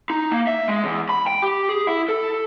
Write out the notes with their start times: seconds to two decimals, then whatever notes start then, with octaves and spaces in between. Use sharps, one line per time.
0.10 D#4
0.31 A#3
0.47 E5
0.68 G#3
0.84 E2
1.09 B5
1.27 G5
1.42 G4
1.69 G#4
1.87 E4
2.08 A4